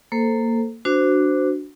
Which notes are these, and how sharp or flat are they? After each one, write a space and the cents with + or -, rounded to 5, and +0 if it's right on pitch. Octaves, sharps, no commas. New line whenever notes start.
A#3 -15 A4 +0 C5 +0
D4 +0 F#4 +0 C5 -25